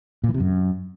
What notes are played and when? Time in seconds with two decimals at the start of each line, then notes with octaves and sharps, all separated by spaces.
0.24 A#2
0.29 E3
0.34 C3
0.40 F#2